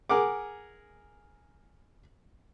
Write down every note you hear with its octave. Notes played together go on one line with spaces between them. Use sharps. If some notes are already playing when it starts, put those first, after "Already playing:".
G#4 A#4 F#5 D6